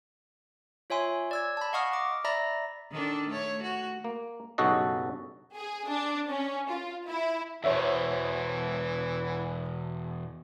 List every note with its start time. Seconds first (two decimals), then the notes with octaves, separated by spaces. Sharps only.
0.90 F4 C#5 E5 G#5 C6
1.31 D5 E6 G#6
1.57 A5 B5
1.73 D#5 F5 F#5 C#6 D#6 F6
1.93 D6
2.24 D5 E5 A#5 B5 A#6
2.92 D#3 D4 A4
3.29 A3 C#5
3.63 F#4
4.04 A#3
4.58 B1 G2 C#3 F#4 A4 D#5
5.55 G#4
5.88 D4
6.29 C#4
6.71 F4
7.07 E4
7.64 E2 B2 E3 C5 C#5 E5